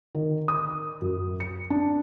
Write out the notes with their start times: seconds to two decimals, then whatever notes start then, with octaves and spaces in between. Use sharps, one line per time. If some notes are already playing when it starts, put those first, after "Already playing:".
0.15 D#3
0.48 D#6
1.02 F#2
1.40 C#7
1.70 D4